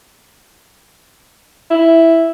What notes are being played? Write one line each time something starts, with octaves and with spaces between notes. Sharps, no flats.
E4